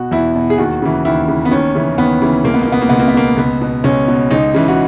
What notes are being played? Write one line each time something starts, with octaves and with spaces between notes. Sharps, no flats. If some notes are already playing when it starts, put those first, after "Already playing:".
Already playing: B2 F#4
E2 E4
B2
G#4
D#2 F#4
C#3 E3
D#2 E4
C#3 E3
B3
D#2 C#4
C#3 E3
D#2 B3
C#3 E3
C#2 A#3
B3
A#3
B2 B3
A#3
C#2 B3
A#3
B3
B2 A#3
C#2 B3
B2
C#2 C#4
B2
C#2 D#4
C#3 E3
F#4